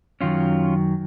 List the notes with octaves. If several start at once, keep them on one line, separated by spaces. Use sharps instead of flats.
F#2 D#3 F#3 C#4 F4